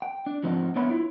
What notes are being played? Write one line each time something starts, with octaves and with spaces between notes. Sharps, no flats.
G5
D4
G#2 F3 C4 D#4
B3 D4 C#5 E5 B5
E4 F4